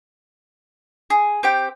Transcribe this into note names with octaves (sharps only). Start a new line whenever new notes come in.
G#4
C4 G4 G5